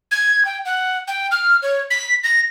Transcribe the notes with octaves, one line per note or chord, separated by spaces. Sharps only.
G#6
G5
F#5
G5
F6
C#5
B6
A#6